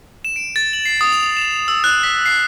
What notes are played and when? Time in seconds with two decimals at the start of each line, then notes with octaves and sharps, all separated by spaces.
0.25 E7
0.36 D7
0.56 A6
0.73 F#7
0.85 C7
1.01 D#6
1.13 F7
1.37 E7
1.68 E6
1.84 F#6
2.03 B6
2.25 C7